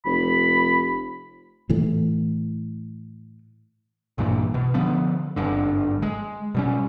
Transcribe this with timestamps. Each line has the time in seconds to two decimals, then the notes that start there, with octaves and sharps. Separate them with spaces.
0.05 F1 B5
1.69 A2 E3 A3
4.18 A#1 G2 A#2 E3
4.54 B2
4.74 D3 F3 B3
5.36 G#1 G2 D3
6.02 G#3
6.55 B2 G3 C#4